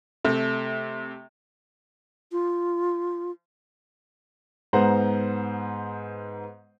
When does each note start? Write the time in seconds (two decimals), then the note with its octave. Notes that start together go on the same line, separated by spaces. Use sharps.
0.24 C3 A3
2.32 F4
4.73 G#2 B3 C5 F#5 A#5